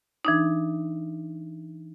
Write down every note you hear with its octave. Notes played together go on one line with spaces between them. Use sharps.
E3 D4 D#4